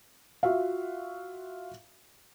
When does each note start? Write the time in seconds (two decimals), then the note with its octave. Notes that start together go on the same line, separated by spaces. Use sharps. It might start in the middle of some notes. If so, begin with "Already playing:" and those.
0.43 F4 F#4 E5 F5